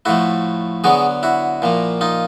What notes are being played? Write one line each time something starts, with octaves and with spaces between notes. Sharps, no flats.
A2 F3 A3 E4 F#4
D3 F#3 B3 F#4 G#4
E4 F#4
A#2 F3 A#3
D#4 F4